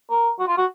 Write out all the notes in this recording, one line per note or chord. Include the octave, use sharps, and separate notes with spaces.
A#4
F#4
F4
F#4